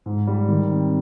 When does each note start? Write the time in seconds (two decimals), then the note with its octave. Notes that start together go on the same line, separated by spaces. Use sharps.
0.06 G#2
0.27 G3
0.48 D#3
0.71 C4